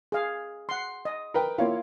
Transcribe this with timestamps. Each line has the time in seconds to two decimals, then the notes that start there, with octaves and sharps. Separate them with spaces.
0.12 G#4 F5
0.69 F#5 C6
1.05 D#5
1.34 A#4 B4 G5
1.58 A#3 E4 F4 C#5 F5